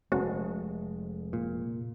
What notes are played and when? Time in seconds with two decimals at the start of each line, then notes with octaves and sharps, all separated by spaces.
0.12 F1 G#3 C#4 F#4
1.33 A#2